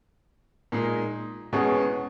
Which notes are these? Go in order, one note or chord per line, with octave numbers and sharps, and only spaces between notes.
A#2 G#3 D#4 G#4
E2 B2 G#3 C#4 G#4